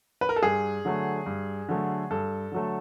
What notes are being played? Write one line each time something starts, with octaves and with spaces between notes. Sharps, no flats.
B4
A#4
A4
G2 G#4
D3 F#3 A3
G2
D3 F#3 A3
G2 A4
D3 F#3 A3